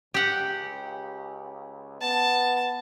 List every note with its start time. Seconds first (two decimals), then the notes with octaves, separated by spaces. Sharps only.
0.14 C#2 G4 F#5
2.01 B3 A5